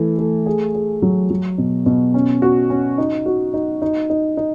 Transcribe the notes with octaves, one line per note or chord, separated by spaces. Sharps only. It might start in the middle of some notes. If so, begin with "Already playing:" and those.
Already playing: E3 A3
A3
G#4
G#4
F#3
F#3
B2
B2
C#4
F#4
C#4
D#4
F#4
D#4
D#4
D#4
D#4